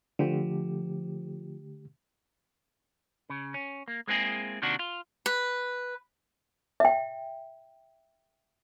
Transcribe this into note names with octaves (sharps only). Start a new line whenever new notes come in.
D3 F3 A3 G4
C#3
C#4
A#3
G#3 A#3 C4 E4 G#4
C3 D#3 A#3 D4 F#4
F4
B4
E5 G5